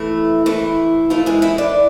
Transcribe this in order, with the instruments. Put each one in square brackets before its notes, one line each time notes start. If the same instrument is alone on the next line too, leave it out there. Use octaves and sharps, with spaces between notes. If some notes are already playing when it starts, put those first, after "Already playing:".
Already playing: [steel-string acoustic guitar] E3 A3 E4
E3 A3 E4
E3 A3 E4 F4
G#3 G#4
E4 E5
D4 D5